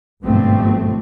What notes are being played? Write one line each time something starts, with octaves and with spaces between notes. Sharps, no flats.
G#1 G2 B2 F3 A3 C4